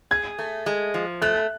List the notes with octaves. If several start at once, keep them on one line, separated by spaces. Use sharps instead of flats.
G#4 G#6
A3
G#3
F3
A3 F#6